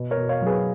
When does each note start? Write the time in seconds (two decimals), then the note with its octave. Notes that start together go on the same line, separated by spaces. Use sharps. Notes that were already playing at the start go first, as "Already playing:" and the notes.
Already playing: B2
0.11 A#4 C#5
0.16 B2
0.29 C#5 F5
0.41 F#3
0.47 G#4 B4